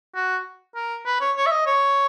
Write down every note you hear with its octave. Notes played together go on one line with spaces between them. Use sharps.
F#4
A#4
B4
C#5
C#5
E5
D#5
C#5